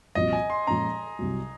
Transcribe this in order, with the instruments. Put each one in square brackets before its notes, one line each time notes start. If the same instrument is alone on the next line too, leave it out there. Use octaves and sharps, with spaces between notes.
[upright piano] C2 A#2 F3 C4 F#4 [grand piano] D#5
[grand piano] G#5
C6
[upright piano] A#2 F3 G#3 C#4 [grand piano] A#5
[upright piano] C2 C3 F#3